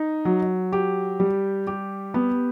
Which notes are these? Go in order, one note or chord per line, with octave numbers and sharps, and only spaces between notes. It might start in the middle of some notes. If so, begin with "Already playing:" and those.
Already playing: D#4
F#3
G4
G3
G4
B3